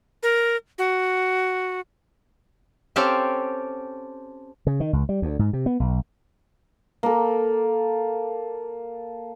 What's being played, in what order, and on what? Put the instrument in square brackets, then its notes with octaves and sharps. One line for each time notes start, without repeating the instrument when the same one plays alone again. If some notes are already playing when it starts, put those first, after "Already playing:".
[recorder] A#4
F#4
[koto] C4 C#4 G4 A4 F5
[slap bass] C#3
D#3
C#2
G3
D2
G#2
C3
B3
B1
[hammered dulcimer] A#3 A4